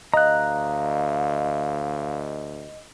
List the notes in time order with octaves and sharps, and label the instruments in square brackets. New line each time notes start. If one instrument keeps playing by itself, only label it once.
[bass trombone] D2 [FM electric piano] D#5 [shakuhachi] F5 [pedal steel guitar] A#5 F#6